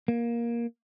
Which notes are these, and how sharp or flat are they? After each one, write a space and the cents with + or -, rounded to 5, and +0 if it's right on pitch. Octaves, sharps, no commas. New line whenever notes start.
A#3 +15